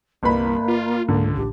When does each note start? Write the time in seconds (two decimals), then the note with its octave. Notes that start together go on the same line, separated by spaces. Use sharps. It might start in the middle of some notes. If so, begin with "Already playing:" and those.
0.23 G1 C2 A#3 B4 B5
0.68 F4
1.09 C#2 G#2 D3
1.36 A1 D4 G4